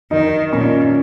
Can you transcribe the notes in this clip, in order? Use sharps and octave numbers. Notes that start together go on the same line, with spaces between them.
D#3 D#4
A#2 C#4